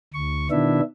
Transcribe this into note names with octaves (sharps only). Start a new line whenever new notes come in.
D2 C#6
B2 D#3 B3 D4 E4 E5